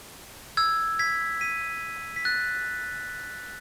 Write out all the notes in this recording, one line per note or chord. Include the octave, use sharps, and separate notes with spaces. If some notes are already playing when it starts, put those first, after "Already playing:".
E6 G#6
G#6 B6
B6 D#7
B6
F#6 A6